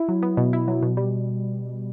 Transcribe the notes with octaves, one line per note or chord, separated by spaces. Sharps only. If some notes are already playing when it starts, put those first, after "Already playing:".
Already playing: E4
F#3
B3
B2
E4
F#3
B2
G3